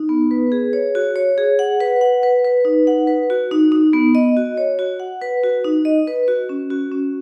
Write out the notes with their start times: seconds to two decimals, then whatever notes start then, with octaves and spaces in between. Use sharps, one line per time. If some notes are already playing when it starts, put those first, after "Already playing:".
Already playing: D#4
0.09 B3
0.31 B4
0.52 G#4
0.73 C#5
0.95 F#4
1.16 C#5
1.38 G#4
1.59 F#5
1.80 B4
2.01 F#5
2.23 B4
2.45 B4
2.65 D#4
2.87 F#5
3.07 B4
3.30 F#4
3.51 D#4
3.72 D#4
3.94 B3
4.15 D#5
4.37 F#4
4.57 C#5
4.79 F#4
5.00 F#5
5.21 B4
5.43 F#4
5.64 D#4
5.85 D#5
6.08 B4
6.28 F#4
6.49 C#4
6.70 F#4
6.92 C#4